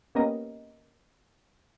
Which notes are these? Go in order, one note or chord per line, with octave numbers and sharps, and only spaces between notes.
A#3 B3 C#4 G4 A#4 D#5